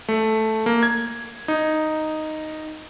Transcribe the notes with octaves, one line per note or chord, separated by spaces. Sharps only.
A3
A#3
G#6
D#4